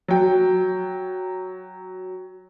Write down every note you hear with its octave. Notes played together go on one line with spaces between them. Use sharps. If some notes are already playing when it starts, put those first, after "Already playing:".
F#3 G5